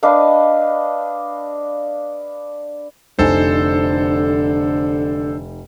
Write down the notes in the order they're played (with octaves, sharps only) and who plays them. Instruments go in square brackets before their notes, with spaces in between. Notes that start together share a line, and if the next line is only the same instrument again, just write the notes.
[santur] D4 B4 D#5 F5
[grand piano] F1 D#4 G#5 [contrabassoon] D3 [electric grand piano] A4 C5